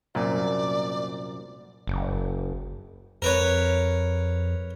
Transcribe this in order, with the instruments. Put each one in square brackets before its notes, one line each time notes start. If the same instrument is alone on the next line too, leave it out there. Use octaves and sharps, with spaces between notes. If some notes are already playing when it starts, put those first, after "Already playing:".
[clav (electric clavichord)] C2 F#2 A#2 [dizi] D5
[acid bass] F#1
[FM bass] F2 [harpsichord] A#4 B4 C#5